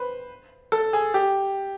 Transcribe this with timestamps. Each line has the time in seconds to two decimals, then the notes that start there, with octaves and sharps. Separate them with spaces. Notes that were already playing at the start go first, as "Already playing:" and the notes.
Already playing: B4 C5
0.72 A4
0.93 G#4
1.14 G4